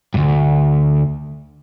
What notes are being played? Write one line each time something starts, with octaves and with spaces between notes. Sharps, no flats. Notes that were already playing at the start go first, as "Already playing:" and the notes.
D2 G2